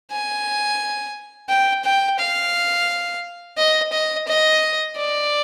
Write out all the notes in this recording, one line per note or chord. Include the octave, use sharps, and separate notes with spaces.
G#5
G5
G5
F5
D#5
D#5
D#5
D5